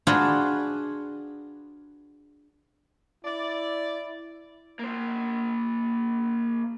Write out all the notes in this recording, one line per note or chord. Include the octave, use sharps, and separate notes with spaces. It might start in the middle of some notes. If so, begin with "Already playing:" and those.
D4 F4 F#4 G#4 B4 D#5
E4 D5
A#3 C5